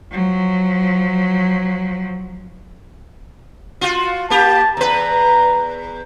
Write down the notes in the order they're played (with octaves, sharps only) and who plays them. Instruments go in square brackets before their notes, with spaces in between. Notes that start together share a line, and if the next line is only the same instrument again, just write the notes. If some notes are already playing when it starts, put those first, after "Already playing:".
[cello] F3 F#3
[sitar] F4 F#4
[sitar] A#3 G4 [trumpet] A5
[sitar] E2 B4 [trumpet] A#5